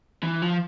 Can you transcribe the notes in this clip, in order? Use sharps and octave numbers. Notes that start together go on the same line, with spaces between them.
E3
F3